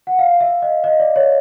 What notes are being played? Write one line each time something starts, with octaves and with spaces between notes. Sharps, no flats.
F#5
F5
E5
D#5
D#5
D5
C#5